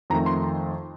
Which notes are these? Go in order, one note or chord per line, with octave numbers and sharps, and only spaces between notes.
F2 D#3 A3 A#5
C6